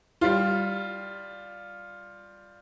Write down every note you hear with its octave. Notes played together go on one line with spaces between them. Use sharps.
G3 F4